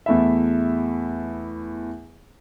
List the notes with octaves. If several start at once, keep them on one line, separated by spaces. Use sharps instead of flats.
E2 A3 E4 E5